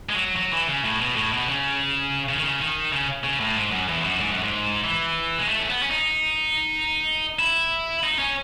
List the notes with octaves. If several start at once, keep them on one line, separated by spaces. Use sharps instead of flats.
G#3
F#3
F#3
E3
C#3
A2
B2
A2
B2
C#3
C#3
D#3
C#3
D#3
C#3
C#3
A2
G#2
F#2
E2
F#2
G#2
F#2
G#2
E3
G#3
A3
C#4
B3
C#4
D#4
E4
D#4
C#4